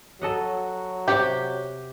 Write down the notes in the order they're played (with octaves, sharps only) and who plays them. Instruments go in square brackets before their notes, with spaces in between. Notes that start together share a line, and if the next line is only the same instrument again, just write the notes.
[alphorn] F#3 [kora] A4 D#5 F#5
[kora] C3 F#5 [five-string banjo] G4